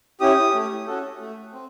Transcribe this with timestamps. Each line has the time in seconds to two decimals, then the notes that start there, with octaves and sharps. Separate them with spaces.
0.20 C#4 E4 G4 D#6
0.54 A3
0.87 C#4 F#4 A4
1.20 A3
1.53 C4